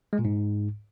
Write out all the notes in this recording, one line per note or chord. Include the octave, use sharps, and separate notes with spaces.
G#3
A#2
G#2